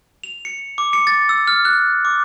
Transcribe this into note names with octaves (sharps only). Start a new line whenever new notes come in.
F7
C#7
D6
C#7
A6
E6
F6
F#6
D6